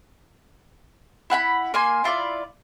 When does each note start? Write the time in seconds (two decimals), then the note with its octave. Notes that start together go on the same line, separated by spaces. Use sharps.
1.30 E4 F#5 G#5 B5
1.74 A#3 G#5 C6
2.04 E4 F4 C#5 D5